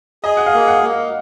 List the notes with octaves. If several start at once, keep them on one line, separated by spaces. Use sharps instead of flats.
G#4 D#5
F#5
F5
A#3
F#5
A#3